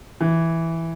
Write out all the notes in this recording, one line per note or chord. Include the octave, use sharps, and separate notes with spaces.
E3